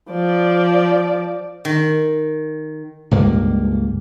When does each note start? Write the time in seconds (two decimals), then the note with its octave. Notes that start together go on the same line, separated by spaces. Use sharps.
0.10 F3 D5
1.65 D#3
3.11 C#2 G2 A#3